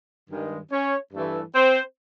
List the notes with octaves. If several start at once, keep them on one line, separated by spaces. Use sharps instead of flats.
G2 D#3 G#3
C#4 C#5
G2 E3 A3
C4 C5